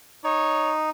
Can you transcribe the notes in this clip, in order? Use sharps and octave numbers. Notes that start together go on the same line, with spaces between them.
D#4 C#5